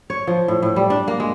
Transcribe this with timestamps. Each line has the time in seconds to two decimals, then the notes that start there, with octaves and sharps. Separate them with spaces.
0.10 C#5
0.27 F3
0.48 A2
0.62 A2
0.76 G3
0.90 D4
1.08 A#3
1.20 G#3